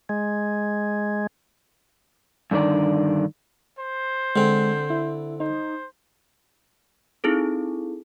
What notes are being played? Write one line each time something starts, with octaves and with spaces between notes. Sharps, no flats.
G#3
G2 D3 D#3 D5
C5
D3 G#3 C4
E4
D#4 C5
C4 D#4 E4 G#4 A4